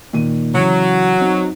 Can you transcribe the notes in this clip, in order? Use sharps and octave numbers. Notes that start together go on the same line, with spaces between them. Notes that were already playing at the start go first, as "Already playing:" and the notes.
A#2 D#3 D#7
C#3 E3 F#3 C#7
C4 D#4